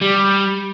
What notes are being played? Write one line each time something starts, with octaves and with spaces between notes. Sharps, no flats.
G3